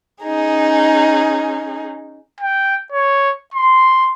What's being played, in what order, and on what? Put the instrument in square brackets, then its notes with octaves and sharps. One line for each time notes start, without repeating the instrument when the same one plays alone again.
[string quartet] C#4 D#4 G#4
[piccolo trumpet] G5
C#5
C6